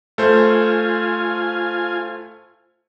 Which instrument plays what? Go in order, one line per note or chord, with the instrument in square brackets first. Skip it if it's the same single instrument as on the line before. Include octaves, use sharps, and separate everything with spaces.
[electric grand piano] A3 C5 [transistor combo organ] F4 G#5